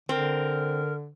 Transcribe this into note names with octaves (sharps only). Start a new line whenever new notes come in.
D3 C4 A#4